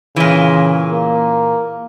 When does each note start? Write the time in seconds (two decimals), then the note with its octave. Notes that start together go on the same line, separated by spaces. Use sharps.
0.16 A#2 C#3 E3
0.91 A#3